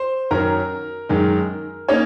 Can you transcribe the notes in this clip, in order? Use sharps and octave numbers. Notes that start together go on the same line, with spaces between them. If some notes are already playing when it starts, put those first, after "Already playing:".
Already playing: C5 C6
F#2 D#3 F#3 C#4 A#4 A#5
F#2 D#3 G#3
A#3 C#4 D#4 C#5